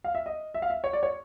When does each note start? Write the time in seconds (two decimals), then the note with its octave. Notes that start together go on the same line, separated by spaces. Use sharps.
0.04 F5
0.15 E5
0.26 D#5
0.54 E5
0.62 F5
0.70 E5
0.84 C#5
0.93 D5
1.03 C#5